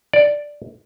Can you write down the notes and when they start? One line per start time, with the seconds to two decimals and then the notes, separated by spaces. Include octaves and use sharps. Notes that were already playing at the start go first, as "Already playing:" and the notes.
0.13 D5